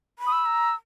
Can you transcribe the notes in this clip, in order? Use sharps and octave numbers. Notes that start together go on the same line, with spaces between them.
B5
D#6
E6
A#5